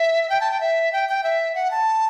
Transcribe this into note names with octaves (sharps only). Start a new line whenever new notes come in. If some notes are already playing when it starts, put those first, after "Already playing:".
Already playing: E5
G5
A5
G5
E5
G5
G5
E5
F#5
A5